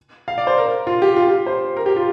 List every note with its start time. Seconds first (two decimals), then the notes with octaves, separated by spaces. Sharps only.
0.28 F5
0.38 D5
0.47 C5
0.58 A#4
0.87 F4
1.02 G4
1.16 F4
1.27 G4
1.46 C5
1.77 A#4
1.86 G4
1.96 F4